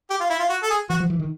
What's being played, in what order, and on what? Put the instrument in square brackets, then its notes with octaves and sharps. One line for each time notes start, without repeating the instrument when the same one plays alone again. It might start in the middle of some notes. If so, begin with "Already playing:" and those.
[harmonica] G4
F4
E4
F4
F#4
A4
G#4
[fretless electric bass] E3 [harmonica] F#4
[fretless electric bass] F3
E3
D#3